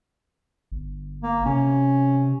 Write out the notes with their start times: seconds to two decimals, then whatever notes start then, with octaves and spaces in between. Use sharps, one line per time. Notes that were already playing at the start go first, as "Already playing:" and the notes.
0.72 G1
1.23 A#3
1.46 C3 C#4